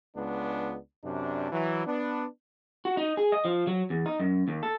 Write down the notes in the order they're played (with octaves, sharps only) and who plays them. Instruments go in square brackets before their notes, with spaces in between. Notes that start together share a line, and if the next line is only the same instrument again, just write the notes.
[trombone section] C#2 G#3 B3 D4
F#2 C3 D4
E3 F#3
B3 D4
[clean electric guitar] F#4
D#4
G#4
D#5
F3
F#3
E2
D#4
F#2
D#2
A4